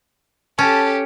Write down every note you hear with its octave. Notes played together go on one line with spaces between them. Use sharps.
C#4 G4 A4 A5